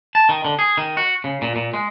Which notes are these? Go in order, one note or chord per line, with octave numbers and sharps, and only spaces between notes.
A5
D#3
D3
G#4
D#3
F#4
C#3
A#2
A#2
G#3